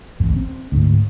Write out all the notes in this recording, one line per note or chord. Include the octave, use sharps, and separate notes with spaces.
D1 A1 G2
C4
D2 G#2